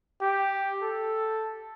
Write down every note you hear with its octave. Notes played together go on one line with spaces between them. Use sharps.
G4
A4